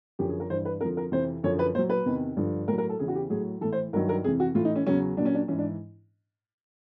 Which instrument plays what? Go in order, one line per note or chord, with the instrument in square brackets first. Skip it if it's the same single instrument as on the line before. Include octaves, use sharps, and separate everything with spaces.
[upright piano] F#2 D3 F3 G4
G#4
A#4
G2 E3 C5
B4
F2 D3 F3 A#4
A#4
F2 C3 E3 C5
F#2 D3 F3 C#5
B4
A#2 C5
F#3
B4
E2 C3 D#3
G2 D3 F3
A2 F#3 A#4
A#4
A4
E2 C#3 E3 G#4
F#4
G4
A2 F#3 G#4
E3 A4
A2
C5
G2 D#3 F#3 A#4
A#4
F2 C3 E3 G#4
F#4
A2 E3 F4
D#4
C#4
E2 C#3 F#3 C#4
A#2 F#3 D4
C#4
D4
G#2 E3 C#4
D4